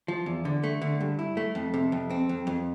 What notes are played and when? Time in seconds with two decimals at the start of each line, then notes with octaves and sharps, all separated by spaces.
0.08 F3
0.26 E2
0.45 D3
0.63 A3
0.81 D3
1.00 G2
1.19 E4
1.37 A3
1.55 F2
1.74 C3
1.92 F2
2.10 C4
2.29 F2
2.47 F2